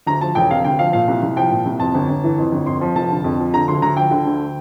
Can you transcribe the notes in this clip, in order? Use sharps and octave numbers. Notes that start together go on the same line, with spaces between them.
D2 A#5
F3 A5
E1 G5
C3 F5
D2 G5
F3 F5
A#2 F5
C2
C2
F3 G5
A#2
C2
F2 A5
G1
G1
E3
F2
G1
F2 C6
F3
F1 A5
D3
F2
F3
D3 A#5
D2 C6
D2 A#5
F3 G5
D3
D2